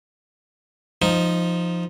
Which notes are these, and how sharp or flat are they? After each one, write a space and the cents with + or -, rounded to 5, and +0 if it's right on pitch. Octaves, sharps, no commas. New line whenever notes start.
F3 -5 D#4 +0